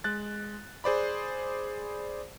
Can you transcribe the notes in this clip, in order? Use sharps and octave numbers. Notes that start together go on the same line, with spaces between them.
G#3 F#6 A6
G#4 C5 D5 B5